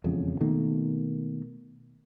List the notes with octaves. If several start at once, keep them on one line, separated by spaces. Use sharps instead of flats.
E1 F2 C#3
B2 D#3 A3 A#3